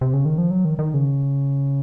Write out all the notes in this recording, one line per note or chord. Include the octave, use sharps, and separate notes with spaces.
C3
C#3
D#3
F3
F#3
D#3
D#3
C#3